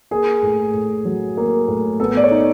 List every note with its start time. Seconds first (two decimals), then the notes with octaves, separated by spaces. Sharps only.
0.11 A#3 G#4
0.43 A2
0.74 A2
1.05 F#3
1.37 A#3
1.68 A2
2.00 B3 A4
2.17 D5
2.24 C#5
2.31 D#4